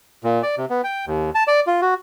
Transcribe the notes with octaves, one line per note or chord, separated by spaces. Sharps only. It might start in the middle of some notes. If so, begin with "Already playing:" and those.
A#2
D5
C3
B3
G5
D#2
A5
D5
F4
F#4